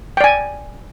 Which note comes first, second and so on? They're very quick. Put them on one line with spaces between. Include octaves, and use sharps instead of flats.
G5 D5 G#5